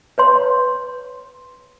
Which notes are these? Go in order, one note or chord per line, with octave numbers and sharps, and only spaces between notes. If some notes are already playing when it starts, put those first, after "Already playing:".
B4 C#5 C6